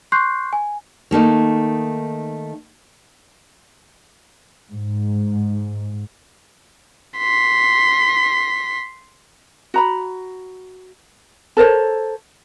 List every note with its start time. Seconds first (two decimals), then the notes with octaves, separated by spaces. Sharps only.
0.12 C6 C#6 F#6 G6 C7
0.53 G#5
1.11 D#3 A3 A#3 D#4
4.72 G#2
7.19 C6 B6
9.74 F#4 A#5 B5
11.57 A4 A#4 C5 C#5